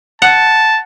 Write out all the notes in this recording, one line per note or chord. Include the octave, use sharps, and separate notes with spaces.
F#5 A5